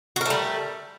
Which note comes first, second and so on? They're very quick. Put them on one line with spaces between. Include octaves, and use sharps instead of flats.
F#4 A#4 A3 G3